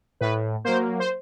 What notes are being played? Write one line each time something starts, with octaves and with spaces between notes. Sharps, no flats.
A2 B4
F#3 A#3 C5
C5